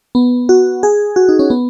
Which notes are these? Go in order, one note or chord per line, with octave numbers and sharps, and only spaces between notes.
B3
F#4
G#4
F#4
D#4
C#4
B3